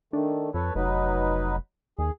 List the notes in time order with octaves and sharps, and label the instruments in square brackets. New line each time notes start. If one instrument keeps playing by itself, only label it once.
[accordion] D#3 A3 [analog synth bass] D4
[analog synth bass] F2 [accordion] A4 B4 C#5
[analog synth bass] F1 [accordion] F#3 D#4 B4
[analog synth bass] D#2 [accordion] G#4